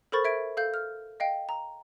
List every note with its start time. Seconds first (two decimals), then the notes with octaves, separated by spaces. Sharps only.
0.12 A4 A#4 C5 B5 C#6 A6
0.25 E5 G#6 D7
0.57 A4 F5 G6
0.74 F6
1.20 D#5 F5 G5
1.49 A#5